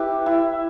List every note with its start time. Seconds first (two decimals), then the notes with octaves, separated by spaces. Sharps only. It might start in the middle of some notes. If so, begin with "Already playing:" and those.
Already playing: E4 G4 B4
0.26 E4